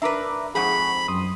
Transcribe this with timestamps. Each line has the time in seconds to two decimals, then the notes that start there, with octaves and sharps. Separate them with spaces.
0.02 D4 A#4 B4 E5 A#5 D6
0.55 F2 G#2 C4 G#4 F#5 B5 C#6
1.08 F#2 C6 D#6